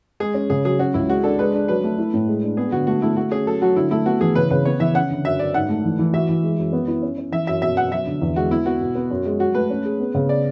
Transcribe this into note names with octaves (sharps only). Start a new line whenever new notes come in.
G#3 G#4
C#4
C#3 G#4
F#3 G#4
C#4 F#4
C#2 E4
G#3 F#4
D4 A4
G#3 B4
D4
F#3 B4
A3
E4
A2
G#3
D4
B3 G#4
D3 F#4
A3 F#4
A3 E4
A3 F#4
C#4 G#4
F#3 A4
F#3 F#4
D3 E4
A3 E4
B3 F#4
E3 G#4
C#3 B4
C#3 B4
B3 C#5
E3 E5
C#4 F#5
D3
F#2 E5
F#2 D5
G#2 F#5
A3
E3
E3
F#4 E5
E3
G#3
F#2
B3
E4
C#4
C#4
E3 E5
F#2 E5
B2 E5
B2 F#5
F#3 E5
D3
E2
G#3 F#4
B3 E4
B3 F#4
B2
B3
F#2
G#3
F#3 F#4
A3 B4
C#4
G#4
B3
C#3
D5